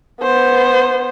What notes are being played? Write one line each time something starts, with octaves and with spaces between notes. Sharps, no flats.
B3 C5